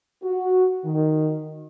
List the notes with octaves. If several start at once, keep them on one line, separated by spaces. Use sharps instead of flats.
F#4
D#3